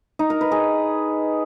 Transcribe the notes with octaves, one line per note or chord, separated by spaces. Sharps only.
D#4
A#4
B4
G#4